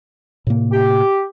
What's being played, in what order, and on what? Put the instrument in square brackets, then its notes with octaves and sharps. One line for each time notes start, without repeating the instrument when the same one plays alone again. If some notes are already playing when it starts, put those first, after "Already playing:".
[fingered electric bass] A2 C3 A#3
[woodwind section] G4